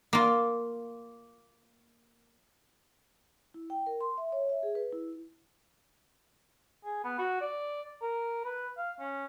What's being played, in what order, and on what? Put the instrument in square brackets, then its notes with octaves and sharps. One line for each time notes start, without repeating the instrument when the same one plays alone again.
[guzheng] A#3 F4
[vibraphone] E4
G5
A#4
C6
E5
C#5
E5
G#4
B4
E4
[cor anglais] G#4
B3
F#4
D5
A#4
B4
F5
C#4